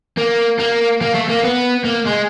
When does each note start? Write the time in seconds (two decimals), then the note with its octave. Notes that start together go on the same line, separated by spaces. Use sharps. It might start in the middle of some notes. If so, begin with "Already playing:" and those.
0.18 A#3
0.59 A#3
1.02 A#3
1.15 A3
1.29 A#3
1.44 B3
1.85 A#3
2.07 G#3